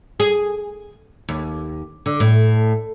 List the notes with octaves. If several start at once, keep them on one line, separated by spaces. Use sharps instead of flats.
G#4
D#2
D3
A2